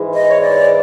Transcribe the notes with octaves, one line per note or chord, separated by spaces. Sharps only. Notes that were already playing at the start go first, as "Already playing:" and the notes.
Already playing: G#2 E3 G#3
D#5
C#5
D5